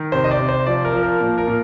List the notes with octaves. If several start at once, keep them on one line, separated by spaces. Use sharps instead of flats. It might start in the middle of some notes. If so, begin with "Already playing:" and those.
Already playing: D#3
C3 C5
D#5
D5
C3
C5
F3 D5
A#4
F3
A#4
A#2
A#4
A#2